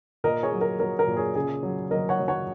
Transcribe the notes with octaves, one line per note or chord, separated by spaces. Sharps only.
A#2 A#4 D#5
G#4 C#5
F#3
A#4
F#3 A#4
A#4
A#2
G#4 C#5
C#3 G#4
F#3
F#3 A#4 D#5
C#5 F#5
F#3
C#5 F#5